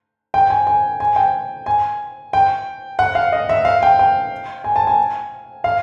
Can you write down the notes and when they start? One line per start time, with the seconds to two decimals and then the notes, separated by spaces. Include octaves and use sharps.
0.34 G5
0.50 G#5
0.67 G#5
1.00 G#5
1.16 G5
1.66 G#5
2.33 G5
2.99 F#5
3.15 F5
3.32 D#5
3.49 E5
3.65 F5
3.83 G5
3.99 G5
4.64 G#5
4.76 A5
4.87 G#5
5.64 F5